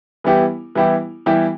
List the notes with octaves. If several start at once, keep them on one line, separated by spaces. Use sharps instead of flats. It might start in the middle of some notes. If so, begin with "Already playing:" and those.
E3 G3 B3 E4 G4
E3 G3 B3 E4 G4
E3 G3 B3 E4 G4